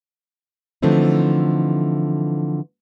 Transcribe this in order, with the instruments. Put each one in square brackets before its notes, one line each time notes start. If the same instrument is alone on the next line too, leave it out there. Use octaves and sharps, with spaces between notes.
[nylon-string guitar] D3 E3 F3 A3 C4 D#4